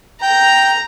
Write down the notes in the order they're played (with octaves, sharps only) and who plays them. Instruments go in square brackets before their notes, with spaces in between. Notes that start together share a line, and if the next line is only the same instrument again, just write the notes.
[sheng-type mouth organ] G5 G6 [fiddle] A#5